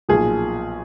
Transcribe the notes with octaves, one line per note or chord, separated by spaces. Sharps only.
B1 A#2 F3 G#4